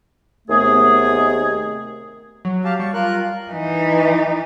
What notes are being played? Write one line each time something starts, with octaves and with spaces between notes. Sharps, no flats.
D#2 C3 D#3 A3 B3 G#4
F#3
G4 F5 A5
G3 C#6
F4 A#4 F#6
E3 D#4